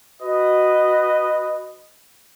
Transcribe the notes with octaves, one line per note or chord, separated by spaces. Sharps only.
F#4 B4 D#5